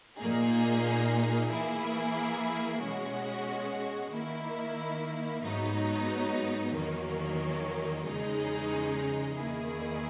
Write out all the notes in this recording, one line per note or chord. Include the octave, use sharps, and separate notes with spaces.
A#2 A#3 D#4 G#4
E3 A#3 E4 G#4
B2 G#3 C#4 F#4
D#3 A#3 E4
G#2 F#3 B3 D#4
E2 D#3 F#3 A#3
E2 C#3 G#3 D#4 G#4
E2 D#3 A#3 E4 G#4